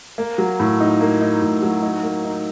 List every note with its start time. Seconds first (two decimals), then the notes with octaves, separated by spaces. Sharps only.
0.18 A#3
0.38 F#3
0.60 A2
0.80 D#4
1.01 A#3
1.21 D#4
1.42 A2
1.62 F#3
1.82 D#4
2.03 A#3
2.24 D#4